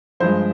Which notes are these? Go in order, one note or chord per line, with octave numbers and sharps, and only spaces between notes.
G2 F3 G#3 C5